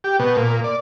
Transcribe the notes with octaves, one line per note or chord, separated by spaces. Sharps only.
G4
B2
A#2
D5